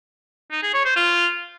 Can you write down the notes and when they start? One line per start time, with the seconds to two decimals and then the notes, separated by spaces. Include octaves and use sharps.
0.52 D#4
0.63 G#4
0.74 C#5
0.85 C5
0.96 F4